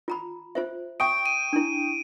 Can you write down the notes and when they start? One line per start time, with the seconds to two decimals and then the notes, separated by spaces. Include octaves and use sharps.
0.08 F4 A#5 B5
0.55 F4 C5 E5
1.00 E5 G5 C#6 D#6 D7
1.26 D#7
1.53 D4 E4